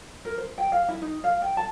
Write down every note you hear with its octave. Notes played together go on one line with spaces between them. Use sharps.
A#4
C5
G5
F5
E4
D#4
F5
G5
A5